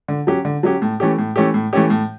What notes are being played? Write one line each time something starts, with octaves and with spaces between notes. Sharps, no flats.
D3
F#3 C#4 G4
D3
F#3 C#4 G4
A2
E3 A3 C#4 G4
A2
E3 A3 C#4 G4
A2
E3 A3 C#4 G4
A2